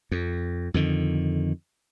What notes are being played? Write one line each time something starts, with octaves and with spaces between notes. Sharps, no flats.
F2
F2 D3 D#3